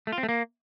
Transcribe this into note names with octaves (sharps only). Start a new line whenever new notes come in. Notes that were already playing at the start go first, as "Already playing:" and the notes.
A3
F4
C4
A3
A#3